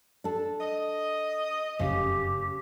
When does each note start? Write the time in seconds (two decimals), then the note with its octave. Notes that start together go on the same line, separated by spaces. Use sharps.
0.24 D4 A4
0.61 D#5
1.79 F1 F#2 C#3 G4